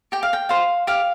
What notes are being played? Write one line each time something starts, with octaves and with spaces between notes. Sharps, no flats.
G4 G5
F5
G5
C5 F5
G4 F5